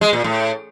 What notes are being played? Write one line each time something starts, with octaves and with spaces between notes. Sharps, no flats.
G#3
A#2
A2